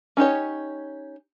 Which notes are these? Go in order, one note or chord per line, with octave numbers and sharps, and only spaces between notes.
C#4 D#4 G4 C#5